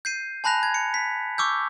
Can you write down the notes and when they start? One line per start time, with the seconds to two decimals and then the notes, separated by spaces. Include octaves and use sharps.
0.05 G6 C7 D#7
0.44 G#5 A5 B5 F#6 A#6 F7
0.63 G#6
0.74 C#7
0.94 B6
1.38 C#6 D6 E6 G6